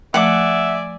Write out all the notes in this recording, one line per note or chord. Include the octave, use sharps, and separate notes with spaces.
F3 A3 D5 E5 F#5 G#5 D6